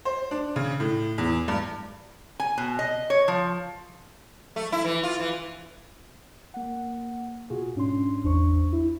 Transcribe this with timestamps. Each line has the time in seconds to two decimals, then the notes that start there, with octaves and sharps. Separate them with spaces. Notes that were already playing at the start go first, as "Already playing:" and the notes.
0.05 C5
0.31 D4
0.56 C#3
0.80 A2
1.18 E2
1.48 G2
2.40 G#5
2.58 B2
2.79 D#5
3.10 C#5
3.28 F3
4.56 A3
4.72 E4
4.85 E3
5.03 F4
5.20 E3
6.54 A#3 F#5
7.50 B2 F4 F#4 G#4
7.75 G#2 C#4 D4 C6
8.24 G#1 E2 D4 C5 C#6
8.73 E4